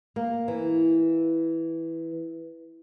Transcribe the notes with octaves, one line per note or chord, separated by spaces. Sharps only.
A#3
E3